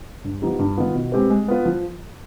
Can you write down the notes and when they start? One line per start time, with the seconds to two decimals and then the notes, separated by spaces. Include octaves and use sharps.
0.24 G2
0.42 F3 B3 D#4 G4
0.59 G2
0.77 D#3 B3 F4
0.95 B2
1.12 G#3 C4 G4 B4
1.30 G#3
1.48 B3 F4 B4
1.65 F3